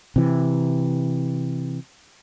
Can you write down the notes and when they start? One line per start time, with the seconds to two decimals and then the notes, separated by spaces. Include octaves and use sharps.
0.16 C3 E3